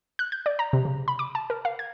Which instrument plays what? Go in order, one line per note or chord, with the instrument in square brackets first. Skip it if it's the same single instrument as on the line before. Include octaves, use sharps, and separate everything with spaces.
[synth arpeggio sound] F#6
G6
D5
A#5
C3
C#3
B5
D6
A5
A#4
F5
G#6